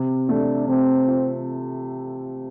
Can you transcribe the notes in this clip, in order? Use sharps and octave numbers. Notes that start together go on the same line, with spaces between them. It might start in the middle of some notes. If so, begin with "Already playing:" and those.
Already playing: C3
A3 D4
C3 C4
F4